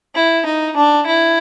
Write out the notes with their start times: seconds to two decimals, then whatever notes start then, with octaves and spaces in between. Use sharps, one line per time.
0.15 E4
0.46 D#4
0.76 D4
1.06 E4